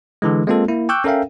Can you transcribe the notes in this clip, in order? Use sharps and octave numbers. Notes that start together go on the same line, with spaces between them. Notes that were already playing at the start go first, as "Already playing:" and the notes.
D3 E3 G#3
G#3 A#3 C4 F4 A4
A#3 E4
G5 C#6 D6 E6 F#6 G6
C#4 A4 A#4 E5 F5 G5